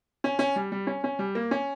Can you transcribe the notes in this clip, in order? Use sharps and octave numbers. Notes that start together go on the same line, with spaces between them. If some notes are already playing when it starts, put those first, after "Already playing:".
C#4
C#4
G3
G3
C#4
C#4
G3
A#3
C#4